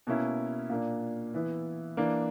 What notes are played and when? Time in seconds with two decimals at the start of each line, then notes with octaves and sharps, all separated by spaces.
0.07 B2 A#3 C#4 E4
0.69 A#2 A#3 D4
1.34 E3 B3 E4
1.97 E3 A#3 D4